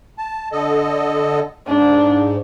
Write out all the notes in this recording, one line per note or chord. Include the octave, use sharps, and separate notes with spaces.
A5
D3 A4 D#5
G#2 D4